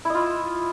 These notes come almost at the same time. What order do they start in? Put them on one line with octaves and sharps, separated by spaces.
E4 D#5 F4